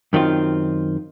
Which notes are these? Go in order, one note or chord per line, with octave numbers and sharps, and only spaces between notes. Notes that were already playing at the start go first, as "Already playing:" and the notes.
F#2 D#3 C4 F4